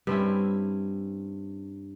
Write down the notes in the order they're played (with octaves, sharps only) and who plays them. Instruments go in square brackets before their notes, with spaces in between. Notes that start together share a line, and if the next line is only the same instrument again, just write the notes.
[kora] G2 C4 C#4 E4